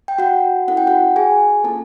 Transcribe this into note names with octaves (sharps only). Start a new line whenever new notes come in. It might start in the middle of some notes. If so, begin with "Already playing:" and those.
G5
F#4 F#5
C#4 E4 A4 F#5
G5
F#4 F#5
G#4 G#5
A#3 C#4 F4 A4 A5